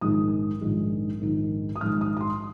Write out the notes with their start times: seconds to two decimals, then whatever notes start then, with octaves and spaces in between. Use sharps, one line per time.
0.01 A#1 G#2 D#3 G#3 D#6
0.61 A#1 G#2 D#3 G#3
1.21 A#1 G#2 D#3 G#3
1.76 D#6
1.81 A#1 G#2 D#3 G#3 F6
2.01 D#6
2.17 D#6
2.21 C6